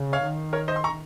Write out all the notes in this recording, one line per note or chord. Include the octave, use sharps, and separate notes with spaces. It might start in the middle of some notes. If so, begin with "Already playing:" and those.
Already playing: C#3
C#5 F5
D#3
A#4 C#5
C5 D#5
C6
A#5 C#6